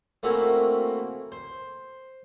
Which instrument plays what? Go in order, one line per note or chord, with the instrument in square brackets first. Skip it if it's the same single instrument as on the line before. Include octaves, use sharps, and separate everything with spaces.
[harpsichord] A3 A#3 C4 C#4 E4 F#4
C5